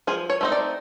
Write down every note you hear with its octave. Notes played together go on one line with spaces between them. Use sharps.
F3 G#4
C#5
A3 C4 D#4
D5